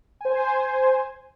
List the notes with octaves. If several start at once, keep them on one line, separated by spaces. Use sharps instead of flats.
C5 G#5